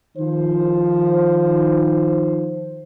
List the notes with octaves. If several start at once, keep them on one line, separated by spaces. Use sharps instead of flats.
D#3 F3 C5